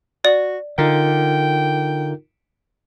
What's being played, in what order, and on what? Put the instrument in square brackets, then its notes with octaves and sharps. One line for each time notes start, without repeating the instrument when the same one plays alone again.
[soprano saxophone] F#4 [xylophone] D5
[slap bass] D3 [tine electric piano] D#4 F4 A#4 [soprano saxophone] G5